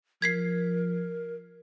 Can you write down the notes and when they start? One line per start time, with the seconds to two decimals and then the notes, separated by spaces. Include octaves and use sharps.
0.22 F3 A#4 G#6 B6 C7